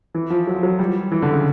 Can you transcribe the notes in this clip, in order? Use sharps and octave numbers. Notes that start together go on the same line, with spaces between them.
E3
F3
F#3
F3
F#3
G3
E3
D3
C#3